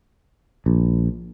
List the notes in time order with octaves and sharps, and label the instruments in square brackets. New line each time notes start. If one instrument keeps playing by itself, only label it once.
[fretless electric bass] A#1